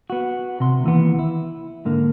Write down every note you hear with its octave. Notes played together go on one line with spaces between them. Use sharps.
B3 F#4
C3 C6
D#2 E3 B3
E4
G#2 D3 A#3